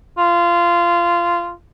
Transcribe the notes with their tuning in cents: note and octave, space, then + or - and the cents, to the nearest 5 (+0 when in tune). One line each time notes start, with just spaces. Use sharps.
F4 -15